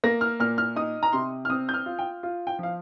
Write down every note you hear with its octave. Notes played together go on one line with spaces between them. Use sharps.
A#3 A#6
F6
A#2 F6
F6
D#4 D#6
A#5
C3 C6
F6
C4 D#6
G6
F6
F4
G5
F4
G5
F3 F5